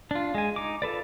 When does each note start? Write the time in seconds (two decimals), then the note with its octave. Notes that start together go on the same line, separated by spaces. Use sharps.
0.11 D4 F4
0.35 G#3 G#5
0.56 D#4 D6
0.82 F4 A4 B4 D5